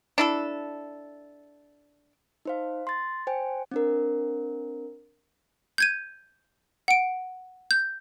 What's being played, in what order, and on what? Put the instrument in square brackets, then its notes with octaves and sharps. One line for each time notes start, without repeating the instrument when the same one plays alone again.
[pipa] D4 E4 A4
[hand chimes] D#4 C5 F5
C6 A6
C5 G5 G#5
C4 D4 A#4
[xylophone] G6 G#6 D#7
F#5 D7
G6